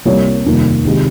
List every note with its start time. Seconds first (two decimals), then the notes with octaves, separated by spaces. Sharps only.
0.05 C2 C3 G3 A#3 C#5
0.46 F1 D#2 D#3 G3 A#3
0.84 C2 C3 D#3 G#3